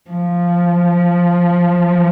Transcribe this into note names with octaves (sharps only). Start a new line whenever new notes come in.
F3